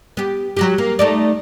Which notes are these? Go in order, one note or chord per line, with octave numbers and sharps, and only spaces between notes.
B3 G4
F#3 F#4 G4
A#3
A3 D#4 D5